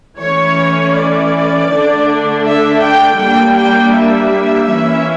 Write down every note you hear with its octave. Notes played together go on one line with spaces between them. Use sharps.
E3 A3 C#4 C#5
D5
D3 A3 D4
E5
G5
G3 A#3 D4 G5
G5
E5
E3 A#3 C#4